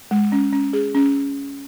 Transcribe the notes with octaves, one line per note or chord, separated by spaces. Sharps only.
G#3
C#4
C#4
G#4
C#4